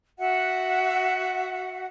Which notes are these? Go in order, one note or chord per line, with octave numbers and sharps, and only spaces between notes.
F#4 E5 F#5